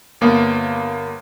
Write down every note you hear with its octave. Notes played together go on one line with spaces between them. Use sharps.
G1 A#3 B3